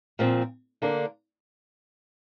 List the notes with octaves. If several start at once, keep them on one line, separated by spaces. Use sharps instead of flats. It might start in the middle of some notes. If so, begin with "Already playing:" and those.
A#2 F3 C4
D3 A#3 D4